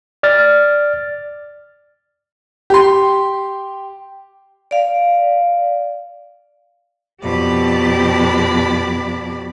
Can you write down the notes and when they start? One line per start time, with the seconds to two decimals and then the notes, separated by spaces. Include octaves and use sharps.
0.23 D5 F6 A6
2.70 G4 C6
4.71 D5 F5
7.22 F2 B2 G4 D5 A5 B5